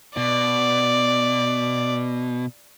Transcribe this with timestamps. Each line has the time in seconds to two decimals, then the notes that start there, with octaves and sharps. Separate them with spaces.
0.17 B2 D5